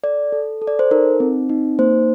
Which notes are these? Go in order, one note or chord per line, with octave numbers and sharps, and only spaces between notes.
A4 D5
A4
A4
D5
C5
D#4 A#4
C4
D#4
A#3 C5